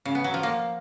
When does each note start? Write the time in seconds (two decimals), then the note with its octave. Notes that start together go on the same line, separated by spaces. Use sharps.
0.05 C#3
0.15 B3
0.24 F#3
0.34 F3
0.43 A#3